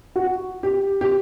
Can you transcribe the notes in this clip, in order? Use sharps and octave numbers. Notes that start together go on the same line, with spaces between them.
F#4
G4
G4